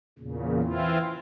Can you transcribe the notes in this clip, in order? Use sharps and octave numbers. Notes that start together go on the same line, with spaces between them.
E2 A#2 C#3
E3 C4 E4 F4